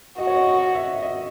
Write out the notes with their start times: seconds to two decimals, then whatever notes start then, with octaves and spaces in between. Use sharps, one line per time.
0.18 F#4 D#5
0.27 C#5
0.35 D#5
0.47 D#5
0.75 E5
1.02 D#5